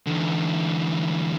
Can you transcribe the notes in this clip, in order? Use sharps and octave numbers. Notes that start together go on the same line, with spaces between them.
E2 D3